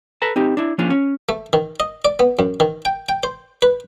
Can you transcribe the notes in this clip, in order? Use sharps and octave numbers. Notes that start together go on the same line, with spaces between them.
A4 B4 A5 A#5
C4 D#4 G4
D4 E4
F3 A#3 C#4 D4 F4
C#4
A3
D#3
D#5
D5
B3
F#2
D#3
G5
G5
C5
B4